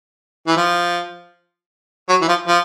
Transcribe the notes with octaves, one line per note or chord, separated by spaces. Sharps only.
E3
F3
F#3
E3
F3
F3